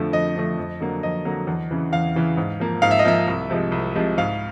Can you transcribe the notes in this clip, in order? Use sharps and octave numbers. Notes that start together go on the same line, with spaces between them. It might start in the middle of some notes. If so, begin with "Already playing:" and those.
Already playing: F2 D3 F3 A3
F2 D#5
D3 F3 A3
F2
D3 F#3 A#3
F2 D#5
D3 F#3 A#3
E2
C#3 E3
E2 F5
C#3 E3
G#2
F3 A#3
G#2 F5
E5
D#5
F3 A#3 E5
C2
C3 F3 G#3
C2
C3 F3 G#3
G#2 F5